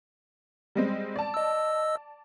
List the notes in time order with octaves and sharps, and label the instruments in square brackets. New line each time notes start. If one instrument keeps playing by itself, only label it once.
[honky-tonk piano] G3 G#3 C4
D5 A5
[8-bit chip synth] D#5 E6